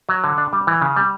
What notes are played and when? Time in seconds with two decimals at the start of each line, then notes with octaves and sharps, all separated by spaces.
0.09 F#3
0.24 D3
0.38 D4
0.53 G3
0.67 E3
0.81 C#3
0.96 G3